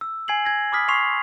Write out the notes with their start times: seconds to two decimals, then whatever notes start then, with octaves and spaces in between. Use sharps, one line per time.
0.01 E6
0.28 G#5 G#6 C7 F#7
0.45 G#6 A#6
0.72 B5 D6 D#6 F6 B6
0.88 C6 C#6 D#6 C7 F7